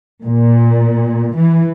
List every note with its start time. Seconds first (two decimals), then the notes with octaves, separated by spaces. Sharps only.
0.22 A#2
1.36 E3